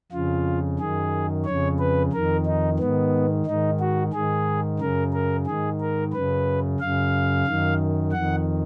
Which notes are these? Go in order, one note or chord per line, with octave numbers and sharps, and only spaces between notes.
F2 C#3 F4
F#2 D#3 G#4
F2 C#3 C#5
B4
F2 D#3 A#4
D#4
G#2 D#3 B3
G#2 D#3 D#4
F#4
G#2 D#3 G#4
F#2 C#3 A#4
A#4
G#2 D#3 G#4
A#4
F#2 C#3 B4
F#2 C#3 F5
F#2 D#3
F2 D#3 F#5